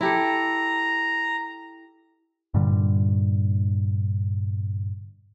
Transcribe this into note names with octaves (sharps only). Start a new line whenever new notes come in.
E4 G4 A4 A#5
G2 A#2 D3 G3